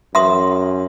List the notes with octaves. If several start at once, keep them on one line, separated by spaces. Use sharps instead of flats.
F#2 E5 C6 D#6